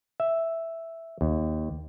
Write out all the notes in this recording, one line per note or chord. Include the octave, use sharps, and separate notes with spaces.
E5
D#2